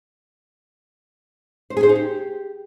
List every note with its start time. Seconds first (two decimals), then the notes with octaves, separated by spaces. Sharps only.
1.70 C5
1.77 G#4
1.83 C5
1.89 D#4
1.95 G4